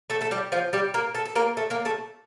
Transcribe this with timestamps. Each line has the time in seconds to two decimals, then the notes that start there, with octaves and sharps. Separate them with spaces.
0.10 A3 A4
0.21 A3 A4
0.31 G3 G4
0.52 F3 F4
0.73 G3 G4
0.94 A#3 A#4
1.15 A3 A4
1.25 A4
1.35 A#3 A#4
1.57 A3 A4
1.70 A#3 A#4
1.85 A3 A4